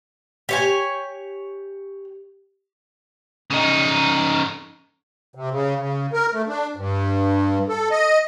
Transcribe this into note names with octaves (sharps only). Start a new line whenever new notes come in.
G4 C#5 G#5
C#3 D#4
C3
C#3
C#3
A#4
A3
D4
G2
A4
D#5